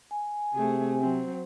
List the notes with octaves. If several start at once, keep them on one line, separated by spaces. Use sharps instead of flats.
G#5
C3 A3 G#4
F#3 C4